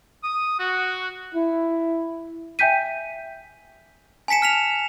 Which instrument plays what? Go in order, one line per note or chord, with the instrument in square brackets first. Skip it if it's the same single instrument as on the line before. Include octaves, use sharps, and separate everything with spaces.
[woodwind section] D#6
F#4
[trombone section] E4
[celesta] E5 G5 G#5 G6 B6 D#7
[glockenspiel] G#5 A5 B6 C#7 E7
F6 B6 F7